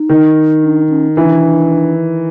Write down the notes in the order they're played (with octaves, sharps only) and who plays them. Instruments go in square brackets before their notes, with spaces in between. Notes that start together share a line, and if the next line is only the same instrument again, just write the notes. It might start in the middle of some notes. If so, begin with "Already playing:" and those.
Already playing: [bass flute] D#4
[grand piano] D#3
[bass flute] D4
C#4
[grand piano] E3 [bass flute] D4